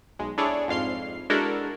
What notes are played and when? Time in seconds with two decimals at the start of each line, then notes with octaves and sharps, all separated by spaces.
0.19 B1 G#3
0.38 D4 E4 G#4 A4 C#5 D5
0.68 F2 G#2 F5 C6 C7
1.30 G#3 D4 E4 F#4 A4 A#4